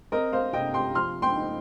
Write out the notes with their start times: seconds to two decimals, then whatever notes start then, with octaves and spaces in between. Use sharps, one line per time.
0.12 C4 A#4 D#5
0.33 C5 F5
0.53 C3 D#5 G5
0.74 G5 C6
0.95 F3 C6 F6
1.22 G5 C6
1.36 D#4